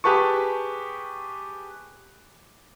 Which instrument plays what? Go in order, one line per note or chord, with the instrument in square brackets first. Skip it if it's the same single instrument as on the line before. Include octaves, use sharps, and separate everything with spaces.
[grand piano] G4 G#4 B4 A5 C#6